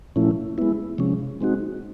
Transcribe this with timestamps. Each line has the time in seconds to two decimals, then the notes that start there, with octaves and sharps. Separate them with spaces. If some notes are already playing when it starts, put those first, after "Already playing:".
0.16 A#2 F3 A3 C#4 E4
0.58 G#3 B3 E4
0.98 C3 F3 G#3 C#4
1.41 G#3 C4 D#4 F#4